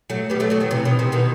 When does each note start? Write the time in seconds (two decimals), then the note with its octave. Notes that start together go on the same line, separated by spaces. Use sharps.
0.10 F#3 A3
0.30 G3 B3
0.40 F#3 A3
0.50 F#3 A3
0.60 D#3 F#3
0.71 C3 E3
0.85 B2 D#3
0.99 C3 E3
1.12 B2 D#3